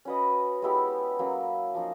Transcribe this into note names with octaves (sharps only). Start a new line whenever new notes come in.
C#4 F#4 B4 D#5
G#3 B3 E4 G4
F#3 A#3 C#4
F3 A#3 D#4